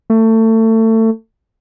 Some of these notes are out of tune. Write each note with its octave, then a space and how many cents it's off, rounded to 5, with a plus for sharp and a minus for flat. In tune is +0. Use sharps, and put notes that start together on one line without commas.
A3 +25